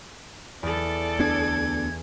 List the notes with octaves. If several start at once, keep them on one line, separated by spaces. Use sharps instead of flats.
E2 A4 D5
D2 B3 D4 G#6